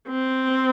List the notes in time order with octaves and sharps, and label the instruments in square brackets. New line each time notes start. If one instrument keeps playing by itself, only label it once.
[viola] C4